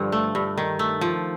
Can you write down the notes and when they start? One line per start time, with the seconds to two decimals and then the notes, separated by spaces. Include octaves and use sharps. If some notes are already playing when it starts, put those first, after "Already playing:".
Already playing: G2 D3 F3
0.12 A3
0.35 G2
0.58 D#3
0.79 A3
1.01 F3